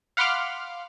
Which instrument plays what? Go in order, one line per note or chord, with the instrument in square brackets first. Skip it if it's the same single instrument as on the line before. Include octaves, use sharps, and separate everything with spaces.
[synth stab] F5 F#5 B5 C6 D6 F6